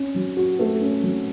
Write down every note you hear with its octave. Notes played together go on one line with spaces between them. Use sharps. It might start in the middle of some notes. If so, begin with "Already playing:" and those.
Already playing: C#4
F#3
F#4
A3
C#4
F#3